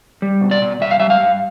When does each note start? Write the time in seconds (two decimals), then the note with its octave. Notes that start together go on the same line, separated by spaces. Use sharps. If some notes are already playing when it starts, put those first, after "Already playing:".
0.22 G3
0.41 B2
0.51 D5
0.62 B2
0.81 G2 E5
0.91 F5
1.00 G3 E5
1.10 F5
1.20 G2